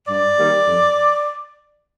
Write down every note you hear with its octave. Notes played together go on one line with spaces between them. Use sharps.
G2 D5
D#3 G3 A#3
F2